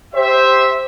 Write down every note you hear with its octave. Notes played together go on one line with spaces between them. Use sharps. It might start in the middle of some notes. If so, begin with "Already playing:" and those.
G4 C5 E5